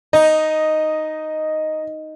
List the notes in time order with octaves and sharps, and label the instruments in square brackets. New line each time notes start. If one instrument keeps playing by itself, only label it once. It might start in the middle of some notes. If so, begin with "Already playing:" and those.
[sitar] D#4 [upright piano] D#5